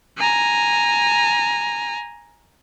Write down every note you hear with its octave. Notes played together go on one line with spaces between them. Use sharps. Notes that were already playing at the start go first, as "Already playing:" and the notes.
G#5 A#5